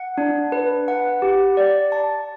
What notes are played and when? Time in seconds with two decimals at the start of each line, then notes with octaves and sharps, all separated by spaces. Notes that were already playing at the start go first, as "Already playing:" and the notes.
Already playing: F#5
0.18 D4
0.52 B4
0.88 F#5
1.22 G4
1.57 D5
1.92 A5